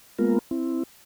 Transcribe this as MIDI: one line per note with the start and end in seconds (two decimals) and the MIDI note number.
0.19 0.39 56
0.19 0.39 58
0.19 0.39 59
0.19 0.39 65
0.19 0.39 70
0.51 0.83 60
0.51 0.83 64